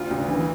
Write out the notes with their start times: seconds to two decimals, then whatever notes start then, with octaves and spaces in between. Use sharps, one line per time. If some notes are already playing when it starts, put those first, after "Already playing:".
Already playing: D2 F4
0.11 D2
0.28 E3